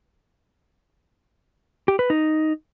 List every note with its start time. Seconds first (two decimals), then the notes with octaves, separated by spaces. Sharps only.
1.88 G4
1.99 B4
2.10 D#4